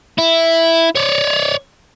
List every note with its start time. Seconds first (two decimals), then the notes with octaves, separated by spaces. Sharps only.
0.18 E4
0.95 C#5 D5